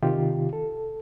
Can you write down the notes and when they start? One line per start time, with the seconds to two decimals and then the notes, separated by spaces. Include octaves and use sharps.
0.03 C3 D#3 F4 G4
0.53 A4